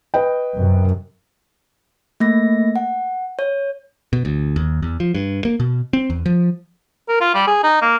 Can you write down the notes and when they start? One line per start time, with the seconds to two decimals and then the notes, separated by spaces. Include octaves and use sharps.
0.14 B4 D#5 G5
0.56 F#2 C3
2.20 A3 A#3 A#6
2.76 F#5
3.39 C#5
4.13 B2
4.25 D2
4.56 D#2
4.82 E2
5.00 F3
5.15 G2
5.45 A#3
5.60 B2
5.93 C4
6.10 E2
6.26 F3
7.08 A#4
7.21 F4
7.34 G3
7.47 G#4
7.64 D#4
7.82 A#3